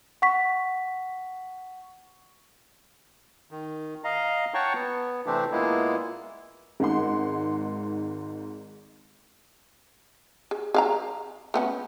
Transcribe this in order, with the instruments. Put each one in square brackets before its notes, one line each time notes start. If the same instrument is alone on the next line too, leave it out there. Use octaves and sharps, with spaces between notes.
[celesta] F#5 C#6 B6
[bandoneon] D#3
D#5 F5 A#5
C#5 F#5 G5 A5 A#5 C#6
B3
C3 E3 A3 C4 D4 G4
A#2 G#3 A#3 B3 E4
[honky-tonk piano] G#1 G#2 G#3 F#5 C6
[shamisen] G#4
G#4 F5 A#5
A3 B3 C#4